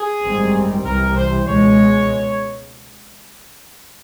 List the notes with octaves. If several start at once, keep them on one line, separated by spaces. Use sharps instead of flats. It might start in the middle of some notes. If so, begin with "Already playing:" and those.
Already playing: G#4
G#1 F#2 D#3 G3 C4
C2 C3 E3 G3 A#4
C5
C#2 B2 G#3 C#5